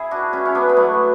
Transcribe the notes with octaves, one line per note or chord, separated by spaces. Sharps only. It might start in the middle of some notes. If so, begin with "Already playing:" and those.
Already playing: E4 G#4
D4 F#4
C#4 E4
C#4
B3 D4
B3
F#3 A3